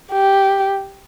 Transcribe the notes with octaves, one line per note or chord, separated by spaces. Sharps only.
G4